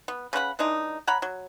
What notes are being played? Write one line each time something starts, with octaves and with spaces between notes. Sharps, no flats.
B3
C#3 B4 F#5 B5
E3 G#3 D4 D#4
C#5 F#5 A#5 B5
F#3